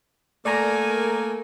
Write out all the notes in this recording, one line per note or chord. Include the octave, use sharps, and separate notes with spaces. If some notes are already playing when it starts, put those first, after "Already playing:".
A3 A#3 A#4 D5 G#5 A#5